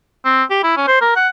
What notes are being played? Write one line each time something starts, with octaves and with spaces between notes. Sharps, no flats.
C4
G4
E4
C#4
C5
A#4
F#5